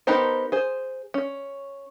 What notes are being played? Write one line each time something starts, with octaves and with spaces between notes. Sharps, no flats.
B3 D#4 G4 A#4 C5
G#4 C5
C#4